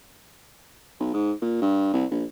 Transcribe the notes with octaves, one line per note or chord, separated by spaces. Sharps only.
B1
G#2
A#2
G2
C2
A#1